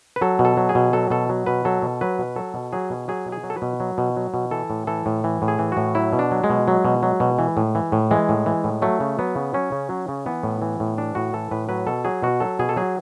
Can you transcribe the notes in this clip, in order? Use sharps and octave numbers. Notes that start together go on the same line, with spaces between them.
B4
F#3 A4
B2
A4
F#3
G#4
B2
F#3 A4
B2 A4
F#3
B2 B4
F#3 A4
B2
F#3 B4
B2
F#3 A4
B2
F#3 G#4
B2
F#3 G#4
B2
G#4
F#3
A4
B4
B2
F#3
B2
F#3
B2
E3 A4
A2
E3 A4
A2
E3
A2
G#4
E3
A2 F#4
F#3 E4
B2
D4
F#3
G#3
B2
F#3
B2
F#3
B2
E3
A2
E3
A2
E3 G#3
A2
E3
A2
F#3 A3
C#3
F#3 B3
C#3
F#3 C#4
C#3
F#3
C#3
E3 B3
A2
E3
A2
E3 D4
A2 F#4
E3 A4
A2 B4
F#3 B4
B2 A4
F#3 G#4
B2 F#4
F#3 A4
B2 G#4
A4
F#3 G#4